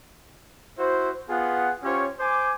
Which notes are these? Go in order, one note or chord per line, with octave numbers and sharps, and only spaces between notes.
E4 F#4 C5
B3 F4 G#4 F#5
C#4 F4 G4 C5 C#5
C5 G#5 D6